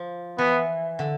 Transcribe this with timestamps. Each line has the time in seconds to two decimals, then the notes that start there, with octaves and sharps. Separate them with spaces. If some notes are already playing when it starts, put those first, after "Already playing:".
Already playing: F3
0.38 E3 B3
0.99 D3